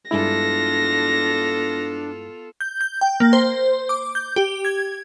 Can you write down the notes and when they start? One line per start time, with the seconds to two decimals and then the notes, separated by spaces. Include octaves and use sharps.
0.11 G2 G#3 B3 D4 E4 F4 A4 A#6
2.61 G6
2.81 G6
3.01 G5
3.20 A#3
3.33 C5
3.89 D6
4.15 G6
4.36 G4
4.65 G#6